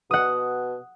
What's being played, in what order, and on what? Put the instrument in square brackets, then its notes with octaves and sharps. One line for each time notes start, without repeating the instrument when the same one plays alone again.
[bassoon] B2 [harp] F#5 D#6